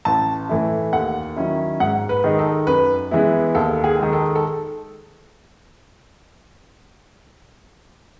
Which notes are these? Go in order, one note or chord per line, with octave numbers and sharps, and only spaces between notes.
A1 A5
A2 E3 A3 E4
D#2 F#5
D#3 F#3 C#4 E4
G#2 F#5
B4
D#3 G#3 D#4
A4
F#2 B4
E3 G#3 B3 E4
D#2 A4
G#4
D#3 G#3
A4
A4